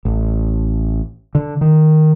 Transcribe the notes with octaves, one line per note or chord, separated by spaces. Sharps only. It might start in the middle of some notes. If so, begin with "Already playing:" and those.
A1
D3
D#3